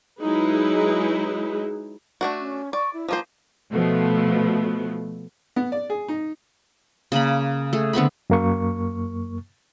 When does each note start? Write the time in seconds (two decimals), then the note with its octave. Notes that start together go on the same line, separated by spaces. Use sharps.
0.20 F#3 G#3 D#4 E4 G#4 B4
2.21 A3 D4 F#4
2.40 C#4
2.73 D5 C#6
2.93 E4
3.08 F3 A#3 F4 C5
3.72 B2 F3 A3 B3
5.56 B3
5.72 D5
5.90 G#4
6.08 D#4
7.12 C#3 A#3 B5
7.73 A3 G#4
7.93 D3 B3 C4 B5
8.30 F#2 A#3 C#6